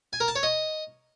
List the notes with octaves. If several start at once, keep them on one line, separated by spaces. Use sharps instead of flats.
G#5
A#4
A5
C#5
D#5